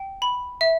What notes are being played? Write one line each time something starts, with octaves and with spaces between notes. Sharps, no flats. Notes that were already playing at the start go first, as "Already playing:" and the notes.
Already playing: G5
B5
E5